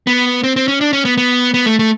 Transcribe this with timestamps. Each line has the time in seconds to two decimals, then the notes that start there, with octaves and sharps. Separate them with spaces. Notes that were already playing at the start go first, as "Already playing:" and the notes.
0.07 B3
0.44 C4
0.56 C4
0.68 C#4
0.81 D4
0.93 C#4
1.05 B3
1.18 B3
1.54 B3
1.66 A3
1.79 A3